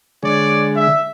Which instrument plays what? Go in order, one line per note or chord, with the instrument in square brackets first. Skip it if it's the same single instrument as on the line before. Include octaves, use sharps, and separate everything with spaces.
[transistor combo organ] D3 G#3 [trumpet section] C#5 D5
[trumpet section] E5